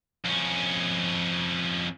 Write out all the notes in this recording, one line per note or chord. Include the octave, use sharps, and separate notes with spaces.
F2 C#4